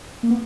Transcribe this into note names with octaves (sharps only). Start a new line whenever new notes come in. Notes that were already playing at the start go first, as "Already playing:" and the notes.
A#3
B3